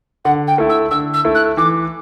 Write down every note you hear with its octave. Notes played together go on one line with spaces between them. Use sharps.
D3 F#5
G5
A3 E4
E6
D3 E6
E6
A3 E4
F#6
E3 D6